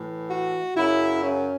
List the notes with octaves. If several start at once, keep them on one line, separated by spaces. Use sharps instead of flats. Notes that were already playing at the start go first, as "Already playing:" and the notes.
Already playing: A2 E3
F#4
F#2 C#3 F#3 E4
C#4